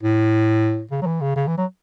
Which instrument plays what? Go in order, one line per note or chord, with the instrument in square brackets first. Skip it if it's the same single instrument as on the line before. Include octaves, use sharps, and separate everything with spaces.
[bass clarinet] A2
C#3
F#3
E3
C#3
C#3
E3
F#3